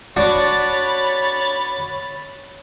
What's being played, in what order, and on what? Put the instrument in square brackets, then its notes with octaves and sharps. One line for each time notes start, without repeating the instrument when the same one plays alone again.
[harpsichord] D4 F#4 [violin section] C#5 B5 A6